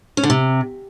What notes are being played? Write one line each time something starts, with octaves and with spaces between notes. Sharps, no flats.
C#4
D3
C3